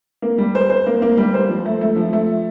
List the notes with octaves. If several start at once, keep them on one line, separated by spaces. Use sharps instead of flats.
A#3
G3
C5
C5
A#3
A#3
G3
C5
F3
A3
A3
F3
A3